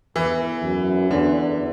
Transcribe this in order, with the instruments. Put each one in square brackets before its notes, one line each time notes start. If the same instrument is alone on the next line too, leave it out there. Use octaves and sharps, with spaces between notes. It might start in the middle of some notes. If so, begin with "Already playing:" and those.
[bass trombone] E2 [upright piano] E3
[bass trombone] F#2
[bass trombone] E2 [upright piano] D3